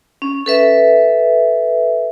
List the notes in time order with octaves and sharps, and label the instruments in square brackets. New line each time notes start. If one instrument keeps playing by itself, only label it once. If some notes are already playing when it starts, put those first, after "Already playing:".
[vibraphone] C#4
A4 B4 E5